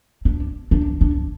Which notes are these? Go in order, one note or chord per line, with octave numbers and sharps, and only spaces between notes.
D4
D4
D4